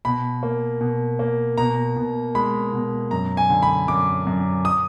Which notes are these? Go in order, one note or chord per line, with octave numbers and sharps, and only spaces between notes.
B2 B5
A#3
B2
A#3
B2 A#5
B2
G#3 B5
B2
F#2 A#5
G#5
D3
B5
F#2 D6
F#2
D#6